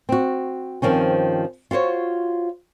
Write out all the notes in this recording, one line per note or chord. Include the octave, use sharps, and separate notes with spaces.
C4 F#4
G2 D#3 F3 C4 C#4
F4 F#4 C5 C#5